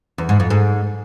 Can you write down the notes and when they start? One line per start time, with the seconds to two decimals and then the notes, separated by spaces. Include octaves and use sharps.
0.18 E2
0.29 G#2
0.40 F2
0.50 G#2